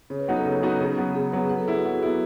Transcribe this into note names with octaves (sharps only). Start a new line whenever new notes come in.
C#3 C#5
B4
F#3 B3 D#4 F#4
A4
C#3
F#3 B3 D#4 F#4
C#3
F#3 B3
C#3 G#4
F#3 B3 B4
F#3 B4
A4
B3 E4 G#4
F#4
F#3
B3 E4